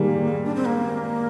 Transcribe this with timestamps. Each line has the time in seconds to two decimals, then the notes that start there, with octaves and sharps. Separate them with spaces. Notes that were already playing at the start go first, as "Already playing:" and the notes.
Already playing: D#3 G3 G#3 A#3
0.44 D4
0.55 C4
0.65 A#3